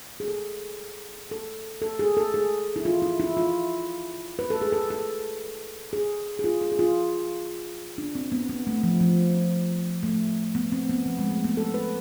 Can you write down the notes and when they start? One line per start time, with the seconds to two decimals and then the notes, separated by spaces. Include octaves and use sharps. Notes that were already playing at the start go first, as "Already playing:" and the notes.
0.20 G#4
0.28 A4
1.31 A4
1.82 A4
1.99 G#4
2.17 A4
2.34 G#4
2.76 E4
2.85 F4
3.02 E4
3.20 E4
3.37 F4
4.39 B4
4.50 A4
4.62 G#4
4.72 A4
4.90 A4
5.93 G#4
6.39 G#4
6.44 F4
6.61 G#4
6.72 G#4
6.79 F4
7.98 D4
8.15 C4
8.32 B3
8.49 B3
8.67 A3
8.83 F3
9.00 F3
10.03 A3
10.55 B3
10.72 C4
10.89 B3
11.06 F3
11.19 G#3
11.31 A3
11.44 B3
11.57 A4
11.74 B4